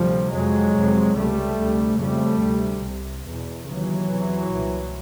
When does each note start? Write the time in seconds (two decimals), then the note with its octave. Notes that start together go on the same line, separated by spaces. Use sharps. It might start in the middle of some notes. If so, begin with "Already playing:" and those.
Already playing: D2 C3 F3 G3
0.33 F2 C3 F#3 G#3
0.75 F2 C3
1.16 C#2 C3 G3 A3
1.58 D2 C3
1.99 F2 C#3 G3 A3
2.41 D2 C3
2.83 C2 C3
3.25 E2 B2
3.66 D#2 C#3 E3 F#3
4.08 E2 C3
4.51 C2 A#2